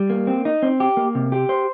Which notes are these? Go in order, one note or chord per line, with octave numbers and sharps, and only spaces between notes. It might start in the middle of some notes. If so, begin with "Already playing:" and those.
Already playing: G3
A#3
C4
D#4
C4
G4
A#3
C3
G4
C5